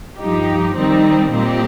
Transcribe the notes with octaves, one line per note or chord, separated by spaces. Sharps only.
G2 F3 D#4 G4
D#3 G3 C4 D#4
A#2 G3 C4 D#4 G4